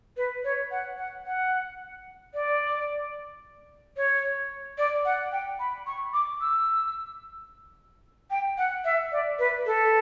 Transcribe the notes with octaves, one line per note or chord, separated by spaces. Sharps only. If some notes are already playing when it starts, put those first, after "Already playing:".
B4
C#5
F#5
F#5
F#5
D5
C#5
D5
F#5
G5
B5
C#6
D6
E6
G5
F#5
E5
D5
B4
A4